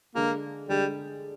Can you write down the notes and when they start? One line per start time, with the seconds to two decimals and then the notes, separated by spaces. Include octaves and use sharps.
0.15 D3 G#3 A#3 D4 G#4
0.69 D3 G3 G#3 D4 G#4